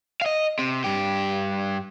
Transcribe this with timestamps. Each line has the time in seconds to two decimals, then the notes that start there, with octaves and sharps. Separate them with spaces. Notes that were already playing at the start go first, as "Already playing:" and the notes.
0.21 D#5 F5
0.59 C3
0.84 G2 G4